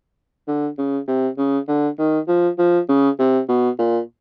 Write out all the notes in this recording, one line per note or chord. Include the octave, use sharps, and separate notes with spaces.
D3
C#3
C3
C#3
D3
D#3
F3
F3
C#3
C3
B2
A#2